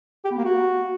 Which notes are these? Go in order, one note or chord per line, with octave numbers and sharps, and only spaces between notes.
G4
B3
A#3
F#4